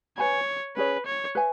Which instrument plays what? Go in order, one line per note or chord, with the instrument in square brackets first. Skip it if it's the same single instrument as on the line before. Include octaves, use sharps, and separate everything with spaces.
[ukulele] B4 G#5 B5 [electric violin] C#5
[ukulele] C#4 G#4 C#5 [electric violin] B4
[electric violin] C#5
[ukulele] B4 E5 G#5